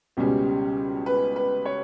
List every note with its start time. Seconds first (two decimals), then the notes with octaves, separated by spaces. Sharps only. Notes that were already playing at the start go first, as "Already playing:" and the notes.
0.17 C#2 B2 G3 C#4
1.06 B4
1.36 B4
1.65 C#5